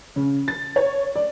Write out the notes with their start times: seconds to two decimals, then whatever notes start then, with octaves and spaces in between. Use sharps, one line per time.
0.16 C#3
0.48 A6
0.76 C#5
1.16 D5